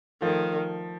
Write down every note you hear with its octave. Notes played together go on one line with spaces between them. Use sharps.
D#3 F3 A3